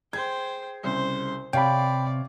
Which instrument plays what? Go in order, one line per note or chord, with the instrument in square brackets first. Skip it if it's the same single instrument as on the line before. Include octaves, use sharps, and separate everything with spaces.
[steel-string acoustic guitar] G#4 [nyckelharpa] C5 G5 [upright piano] G#6
[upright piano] C2 C#3 [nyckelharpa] C5
[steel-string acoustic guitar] C3 [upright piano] C#5 F5 A5 [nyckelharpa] D5 [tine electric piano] G5 B5